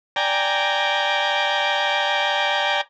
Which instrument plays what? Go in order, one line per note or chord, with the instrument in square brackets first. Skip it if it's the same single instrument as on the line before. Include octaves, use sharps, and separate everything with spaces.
[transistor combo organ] D5 G5 G#5 A#5